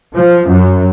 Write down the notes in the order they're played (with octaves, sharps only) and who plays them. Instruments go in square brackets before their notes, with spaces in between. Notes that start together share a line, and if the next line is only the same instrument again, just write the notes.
[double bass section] F3
F#2